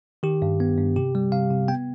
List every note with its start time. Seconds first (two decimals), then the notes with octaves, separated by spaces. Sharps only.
0.23 D#3 G4
0.42 G2
0.60 B3
0.77 G2
0.96 C3 G4
1.15 G3
1.32 C3 F5
1.50 C3
1.68 B3 G5